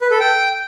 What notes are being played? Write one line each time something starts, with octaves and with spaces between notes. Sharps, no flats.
B4
A4
G5